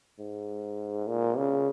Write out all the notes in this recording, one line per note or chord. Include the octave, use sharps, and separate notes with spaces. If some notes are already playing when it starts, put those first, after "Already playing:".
G#2
A#2
C#3